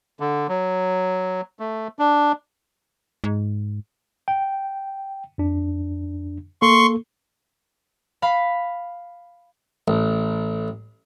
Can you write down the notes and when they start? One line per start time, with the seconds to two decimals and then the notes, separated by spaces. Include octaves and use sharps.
0.20 D3
0.49 F#3
1.59 A3
1.99 D4
3.24 G#2
4.28 G5
5.38 F2 D4
6.62 A#3 A4 C6 C#6
8.22 F5 B5
9.88 A1